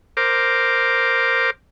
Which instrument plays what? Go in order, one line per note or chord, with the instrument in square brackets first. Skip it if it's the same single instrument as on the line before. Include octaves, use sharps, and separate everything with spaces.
[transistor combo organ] A#4 C5 D6